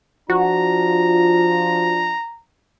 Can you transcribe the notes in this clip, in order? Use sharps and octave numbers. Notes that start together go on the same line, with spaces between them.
F3 D4 F4 F#4 A#5